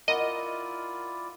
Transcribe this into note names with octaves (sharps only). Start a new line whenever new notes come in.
E4 F4 A#4 D5 D#5 F#5 D#7